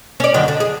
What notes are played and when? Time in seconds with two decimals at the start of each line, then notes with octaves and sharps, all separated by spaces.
0.20 C#4 D5
0.34 F#2 D3 D#3
0.48 D3
0.60 G#4